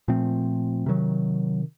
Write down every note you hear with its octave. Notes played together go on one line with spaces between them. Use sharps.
A#2 F3 A3 C4
C3 D#3 F#3